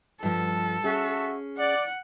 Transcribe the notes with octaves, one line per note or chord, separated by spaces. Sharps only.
G2 F3 A4
C#4 F#4 G#4 E5
D5 F#5